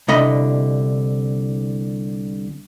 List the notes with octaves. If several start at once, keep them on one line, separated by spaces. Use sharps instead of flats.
C2 D3 D#5 B5